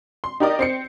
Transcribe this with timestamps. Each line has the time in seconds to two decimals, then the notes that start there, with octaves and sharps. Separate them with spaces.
0.24 C6
0.40 D#4 G4 A#4 D5 D#5
0.59 C4 C7 C#7